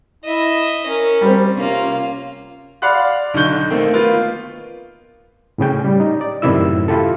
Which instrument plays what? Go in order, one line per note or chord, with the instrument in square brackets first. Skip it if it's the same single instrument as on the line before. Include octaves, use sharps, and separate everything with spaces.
[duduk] E4 [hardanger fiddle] D#5 E5
[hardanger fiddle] C#4 [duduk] A#4
[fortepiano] G3 C4
[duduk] C3 [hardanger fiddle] A#3 F4 [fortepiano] C#4
[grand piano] D5 F5 F#5 B5 C6 F#6
B1 D3 D#4 C#6 G6 G7
D#3 A3 A#3 C4
A#3 B3 F4
[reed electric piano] A2 C#3 C#4 G5
G3
D#4
D5
F#2 A2 C3 D#3 E4 E6
E4 F4 G4 A4